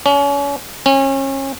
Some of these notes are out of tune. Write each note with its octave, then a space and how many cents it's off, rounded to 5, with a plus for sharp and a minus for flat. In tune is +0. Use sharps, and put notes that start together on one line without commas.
C#4 +35
C#4 -30